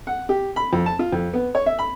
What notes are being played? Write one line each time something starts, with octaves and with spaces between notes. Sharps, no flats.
F#5
G4
B5
F2
A5
F4
F2
B3
C#5
E5
B5